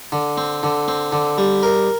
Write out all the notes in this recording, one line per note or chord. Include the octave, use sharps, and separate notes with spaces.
D3
C4
D3
C4
D3
G3
A#4